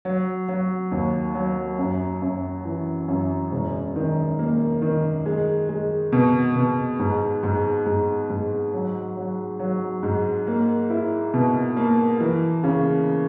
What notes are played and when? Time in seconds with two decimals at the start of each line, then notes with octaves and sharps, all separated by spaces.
0.05 F#3
0.48 F#3
0.91 D#2
1.35 F#3
1.78 F#2
2.22 F#2
2.65 E3
3.08 F#2
3.52 E1
3.96 D#3
4.39 A#3
4.82 D#3
5.26 G#3
5.69 G#3
6.12 B2
6.56 B2
6.99 G#2
7.43 G#2
7.86 G#2
8.30 G#2
8.74 F#3
9.16 F#3
9.60 F#3
10.03 G#2
10.47 A#3
10.90 E4
11.34 B2
11.77 A#3
12.20 E3
12.64 C#3